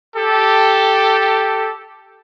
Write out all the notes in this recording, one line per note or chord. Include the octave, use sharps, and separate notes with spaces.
G4 A4